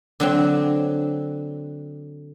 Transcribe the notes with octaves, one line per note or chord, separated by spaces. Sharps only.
D3 F#3 C4